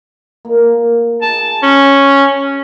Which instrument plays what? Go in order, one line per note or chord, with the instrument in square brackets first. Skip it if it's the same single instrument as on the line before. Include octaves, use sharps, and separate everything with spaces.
[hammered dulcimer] A#3
[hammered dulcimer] G#4 A#5 [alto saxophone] A5
[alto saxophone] C#4